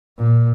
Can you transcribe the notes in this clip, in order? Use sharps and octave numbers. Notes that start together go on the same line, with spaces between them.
A#2